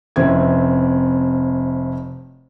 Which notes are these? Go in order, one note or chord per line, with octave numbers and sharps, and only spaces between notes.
F1 C4 C#4 E4 G#6